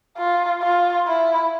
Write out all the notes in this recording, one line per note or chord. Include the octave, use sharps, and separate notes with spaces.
F4
F4
E4